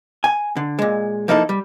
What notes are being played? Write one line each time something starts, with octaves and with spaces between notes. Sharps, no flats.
G#5
D3
A#2 G#3
F3 A#3 D#4 E4 A4
G3